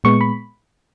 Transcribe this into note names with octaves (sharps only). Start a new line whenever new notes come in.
A#2 G#3 B3 C#6
B5